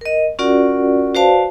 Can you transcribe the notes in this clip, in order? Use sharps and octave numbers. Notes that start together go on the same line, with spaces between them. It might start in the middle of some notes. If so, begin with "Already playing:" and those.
A#4 D#5
C#4 F4 F#4 A#4 D5 F#5
F#4 B4 C5 D5 F5 A5